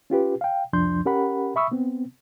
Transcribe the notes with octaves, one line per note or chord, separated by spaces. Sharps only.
C#4 F4 G4 B4
F5 G5
C2 F2 F3 D4 C6 G6
C#4 G4 A#4 F#5 B5
E5 B5 C#6 D#6 E6
B3 C4